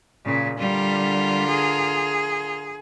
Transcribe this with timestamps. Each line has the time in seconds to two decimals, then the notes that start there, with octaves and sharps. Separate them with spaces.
0.25 A#2 C#3
0.58 D3 G3 F4 A#4
1.48 G#4